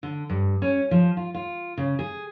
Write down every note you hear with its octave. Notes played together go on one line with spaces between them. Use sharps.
D3
G2
C#4
F3
F4
F4
C#3
G#4